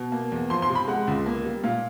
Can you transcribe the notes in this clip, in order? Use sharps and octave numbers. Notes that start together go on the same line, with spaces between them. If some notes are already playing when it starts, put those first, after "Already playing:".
Already playing: B2
A#3
E2
F3 C6
C6
C3
B5
G#3 F#5
C#2
A#3
G3
A#2 F5